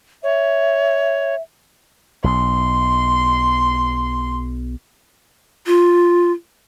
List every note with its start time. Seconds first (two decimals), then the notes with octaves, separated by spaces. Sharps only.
0.23 C#5 E5
2.24 B1 C6
5.67 F4